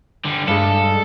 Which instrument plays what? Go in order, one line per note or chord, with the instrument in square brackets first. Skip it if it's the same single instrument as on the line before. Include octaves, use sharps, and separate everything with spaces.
[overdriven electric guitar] D3 G3
[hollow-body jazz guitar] G2 G#3 [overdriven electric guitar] A4